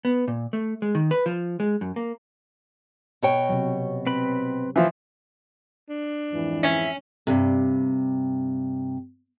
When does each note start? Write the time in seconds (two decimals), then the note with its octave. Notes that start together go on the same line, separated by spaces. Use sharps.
0.05 B3
0.28 A#2
0.53 A3
0.82 G#3
0.95 D#3
1.11 B4
1.26 F3
1.60 G#3
1.81 F#2
1.96 A#3
3.22 B2 C#5 G5
3.49 C3 F#3
4.06 C4 B4 B5
4.76 E3 F3
5.89 D4
6.32 F2 G#2 E3
6.63 C#4 E5
7.27 G2 C3